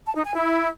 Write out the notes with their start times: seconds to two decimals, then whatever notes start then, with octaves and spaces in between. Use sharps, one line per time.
0.05 A5
0.15 D#4
0.25 G#5
0.35 E4